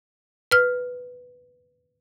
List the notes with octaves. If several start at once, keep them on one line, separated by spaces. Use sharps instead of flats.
B4 F6